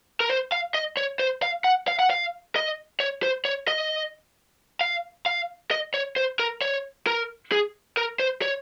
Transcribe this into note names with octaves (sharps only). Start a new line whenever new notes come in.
A#4
C5
F5
D#5
C#5
C5
F5
F#5
F5
F#5
F5
D#5
C#5
C5
C#5
D#5
F5
F5
D#5
C#5
C5
A#4
C#5
A#4
G#4
A#4
C5
C#5